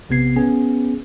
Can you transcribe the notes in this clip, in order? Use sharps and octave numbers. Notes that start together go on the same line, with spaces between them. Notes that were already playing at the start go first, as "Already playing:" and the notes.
A#1 C3 B3 G#6 C7
B3 C#4 G#4 G#5